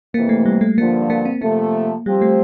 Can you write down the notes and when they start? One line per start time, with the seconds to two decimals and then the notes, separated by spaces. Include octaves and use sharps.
0.14 F2 C3 E3 A#3
0.29 A3
0.46 G3
0.61 A3
0.77 G2 D3 F3 A#3
1.10 A#3
1.25 C4
1.42 C3 F3 A3 A#3
2.06 F3 G3 C4 G4 C5
2.21 A3